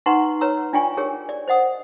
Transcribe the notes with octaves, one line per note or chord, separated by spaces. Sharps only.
D#4 B4 F#5 A#5 C6 C#6
B4 C#5 A#5 E6
D4 F4 D5 G5 G#5 C#6
G4 G#4 A#4 C#5
D5
C5 D#5 F#5 D#6